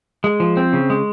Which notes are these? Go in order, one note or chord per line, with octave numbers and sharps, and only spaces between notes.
G#3
F3
C4
C#3
G#3